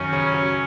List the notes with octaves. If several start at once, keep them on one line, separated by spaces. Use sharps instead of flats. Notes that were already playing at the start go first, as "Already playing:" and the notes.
Already playing: F#2 D#3 F#3 C#4
C#3
F#3